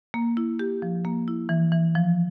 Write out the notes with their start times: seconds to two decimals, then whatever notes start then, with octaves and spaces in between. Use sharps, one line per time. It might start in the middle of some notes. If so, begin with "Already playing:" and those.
0.14 A#3
0.37 E4
0.59 G4
0.82 F3
1.05 A#3
1.28 E4
1.49 E3
1.72 E3
1.95 F3